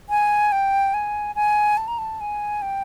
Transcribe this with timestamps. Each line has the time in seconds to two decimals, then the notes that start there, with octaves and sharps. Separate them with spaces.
0.09 G#5
0.52 G5
0.94 G#5
1.35 G#5
1.77 A5
1.88 A#5
1.98 A5
2.21 G#5
2.62 G5